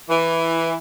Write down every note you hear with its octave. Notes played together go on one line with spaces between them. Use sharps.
E3